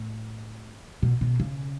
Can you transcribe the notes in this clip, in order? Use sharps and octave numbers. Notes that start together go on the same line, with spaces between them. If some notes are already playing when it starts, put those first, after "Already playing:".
Already playing: A2
B2
B2
C#3